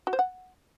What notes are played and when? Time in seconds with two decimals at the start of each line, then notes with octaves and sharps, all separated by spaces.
0.07 F#4
0.13 C5
0.19 F#5